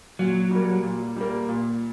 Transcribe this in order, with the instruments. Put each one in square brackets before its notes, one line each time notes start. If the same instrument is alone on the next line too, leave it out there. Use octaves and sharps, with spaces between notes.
[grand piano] A#2 [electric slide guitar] F#3
[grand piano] G3 A#3
A#2
G3 A#3
A#2